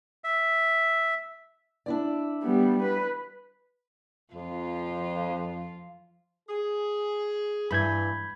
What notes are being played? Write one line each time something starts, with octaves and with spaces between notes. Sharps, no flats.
E5
D4 E4 D5
G3 B3
B4
F2 F3 F4
G#4
G2 E3 B5 G6 G#6